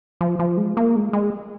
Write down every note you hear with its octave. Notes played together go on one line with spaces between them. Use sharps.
F3
F3
G#3
A#3
G#3
G#3